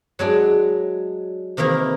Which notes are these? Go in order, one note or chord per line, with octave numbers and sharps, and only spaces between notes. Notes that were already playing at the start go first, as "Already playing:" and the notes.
F#3 G#3 D4
C3 D#3 E3 A#3 A#4